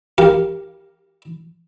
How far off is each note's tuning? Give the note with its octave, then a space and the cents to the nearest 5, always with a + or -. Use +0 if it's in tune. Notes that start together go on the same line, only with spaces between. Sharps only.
G4 +0 A#4 +0 F5 -5